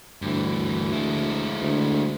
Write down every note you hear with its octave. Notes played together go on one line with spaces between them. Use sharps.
D2 G2 E3
G#3 E4
D2